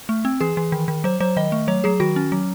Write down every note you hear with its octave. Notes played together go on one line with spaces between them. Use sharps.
A3
C4
E3 G#4
E3
D#3
D#3
F#3 C5
F#3 C5
D#3 D#5
A3
F#3 C#5
F#3 G#4
D#3 F#4
C#4
F#3